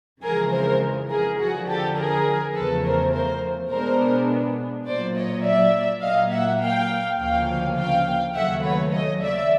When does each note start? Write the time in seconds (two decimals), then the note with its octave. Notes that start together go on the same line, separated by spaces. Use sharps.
0.22 F2 C#3 E3 G#3 G#4 A#4
0.51 A#4 C5
1.10 G#4 A#4
1.39 F2 D3 F3 F#4 G#4
1.67 G4 A4
1.97 G#4 A#4
2.54 E2 C#3 F3 A3 A4 B4
2.84 A#4 C5
3.12 A#4 C5
3.70 B2 G#3 B3 D4 A#4 C5
4.86 A#2 F#3 A#3 C5 D5
5.15 C#5 D#5
5.44 D5 E5
6.02 A#2 F#3 A#3 D#5 F5
6.31 E5 F#5
6.60 F5 G5
7.17 D2 C#3 F3 A#3 C#4 F5 G5
7.76 F5 G5
8.34 D#2 C#3 F#3 A3 E5 F#5
8.63 B4 C#5
8.91 C#5 D#5
9.20 D5 E5